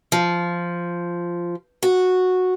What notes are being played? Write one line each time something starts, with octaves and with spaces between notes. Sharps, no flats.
F3
F#4